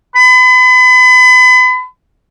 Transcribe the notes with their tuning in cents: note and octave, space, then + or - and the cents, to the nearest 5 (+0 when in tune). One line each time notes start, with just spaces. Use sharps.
B5 +35